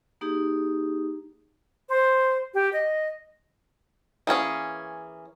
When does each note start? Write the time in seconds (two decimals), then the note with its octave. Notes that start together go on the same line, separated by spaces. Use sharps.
0.21 A#3 D#4 G4 G#4
1.89 C5
2.54 G4
2.73 D#5
4.27 E3 A#3 C#4 G#4